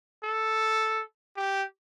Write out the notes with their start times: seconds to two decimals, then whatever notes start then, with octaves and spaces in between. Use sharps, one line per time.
0.24 A4
1.37 G4